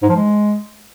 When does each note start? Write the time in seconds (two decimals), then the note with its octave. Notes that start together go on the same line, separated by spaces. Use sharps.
0.02 G#2
0.09 F3
0.16 G#3